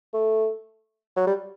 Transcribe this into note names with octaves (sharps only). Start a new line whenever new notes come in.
A3
F#3
G3